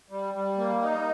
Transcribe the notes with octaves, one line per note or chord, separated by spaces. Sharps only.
G3
G3
A#3
D#4